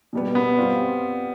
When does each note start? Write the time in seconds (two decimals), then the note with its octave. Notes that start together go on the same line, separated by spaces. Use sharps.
0.13 B2 G3 B3
0.35 B3
0.57 G3 C4 F4